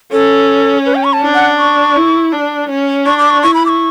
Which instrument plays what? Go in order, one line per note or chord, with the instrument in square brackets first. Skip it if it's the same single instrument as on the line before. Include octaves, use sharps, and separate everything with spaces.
[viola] C#4 [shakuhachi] A4
[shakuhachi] B4
G5
C#6
A5
[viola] D4
[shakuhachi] F#5
C#6
[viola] E4
D4
C#4
[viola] D4 [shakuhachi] C#6
[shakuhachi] D6
C#6
[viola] E4 [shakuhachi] C#6
[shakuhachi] B5
D6
C#6